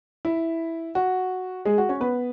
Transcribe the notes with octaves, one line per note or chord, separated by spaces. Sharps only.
E4
F#4
G#3 G#4
F#4
C#4 C#5
B3 B4